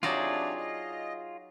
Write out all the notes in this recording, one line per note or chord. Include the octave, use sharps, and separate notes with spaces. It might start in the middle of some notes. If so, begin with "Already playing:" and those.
C3 F#3 D4 D#4 F4 G#4 D5
D#5